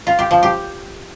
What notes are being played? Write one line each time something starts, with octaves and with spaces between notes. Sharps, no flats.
F4
G4
F3
G4